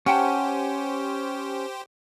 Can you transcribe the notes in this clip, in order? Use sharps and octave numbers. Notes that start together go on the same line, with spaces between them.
C#4 G4 C5 F#5 G5 A5